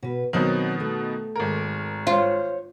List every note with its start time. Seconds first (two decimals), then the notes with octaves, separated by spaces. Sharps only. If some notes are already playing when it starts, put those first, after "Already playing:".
0.03 B2 B4
0.33 B2 D#3 F#3 C4
0.80 A3
1.36 G#1 A#4
2.07 F4 C5 C#5